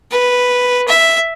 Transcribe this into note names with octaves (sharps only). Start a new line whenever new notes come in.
B4
E5